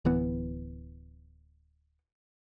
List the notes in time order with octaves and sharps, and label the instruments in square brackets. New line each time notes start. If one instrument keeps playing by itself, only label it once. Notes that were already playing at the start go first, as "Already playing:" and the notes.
[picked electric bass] D1 E3 B3